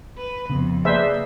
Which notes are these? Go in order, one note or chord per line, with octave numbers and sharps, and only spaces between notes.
B4
F2 C#3 B3
A#3 G#4 B4 C5 D5 E5